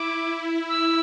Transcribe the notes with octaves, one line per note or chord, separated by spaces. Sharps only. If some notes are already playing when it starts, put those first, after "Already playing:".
Already playing: E4 D6
E6